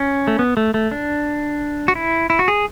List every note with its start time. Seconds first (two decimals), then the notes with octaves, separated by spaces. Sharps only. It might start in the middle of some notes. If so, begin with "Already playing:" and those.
Already playing: C#4
0.27 A3
0.39 B3
0.57 A3
0.74 A3
0.91 D4
1.88 F#4
1.95 E4
2.30 E4
2.39 F#4
2.48 G#4